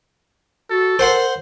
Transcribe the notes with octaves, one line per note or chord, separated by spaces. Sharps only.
F#4 A4
A#4 C5 F#5 C6